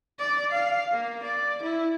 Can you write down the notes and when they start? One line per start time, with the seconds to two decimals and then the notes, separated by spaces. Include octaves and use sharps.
0.19 D5
0.52 F5
0.92 A#3
1.23 D5
1.63 E4